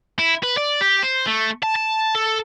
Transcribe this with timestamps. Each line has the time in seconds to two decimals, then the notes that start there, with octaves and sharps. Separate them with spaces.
0.19 E4
0.43 B4
0.57 D5
0.81 G4
1.03 C5
1.27 A3
1.63 A5
1.75 A5
2.15 A4